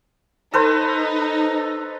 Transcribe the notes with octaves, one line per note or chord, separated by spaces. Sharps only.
D#4 A4 B4 C5